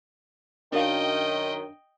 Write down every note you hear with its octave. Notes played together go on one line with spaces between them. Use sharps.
F#2 D#3 D4 A#4 D#5 F5 G5